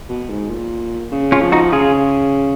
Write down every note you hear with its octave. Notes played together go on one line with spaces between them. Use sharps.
B2
G#2
A#2
C#3
C#4 F4
F3
D#4 F#4
C#3 F4 G#4